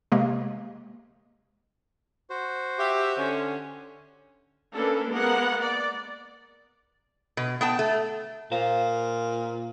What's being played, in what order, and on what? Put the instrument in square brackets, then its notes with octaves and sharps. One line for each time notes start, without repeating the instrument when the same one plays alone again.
[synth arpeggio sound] C3 G#3 A#3
[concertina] F#4 C5
[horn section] G4 E5
D3 C#4
[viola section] A#3 C#4 D4 A4 B4
G#3 A#3 B3 A#4 F#5
D5
[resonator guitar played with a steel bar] B2
B3 G5 A5
A3
[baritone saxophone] A#2 [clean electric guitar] C5 F5